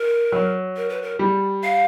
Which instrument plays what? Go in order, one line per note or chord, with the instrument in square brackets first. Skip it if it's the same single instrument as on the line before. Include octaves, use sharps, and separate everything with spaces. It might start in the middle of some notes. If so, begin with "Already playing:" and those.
Already playing: [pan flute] A#4
[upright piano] F#3
[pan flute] A#4
B4
A#4
[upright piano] G3
[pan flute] F5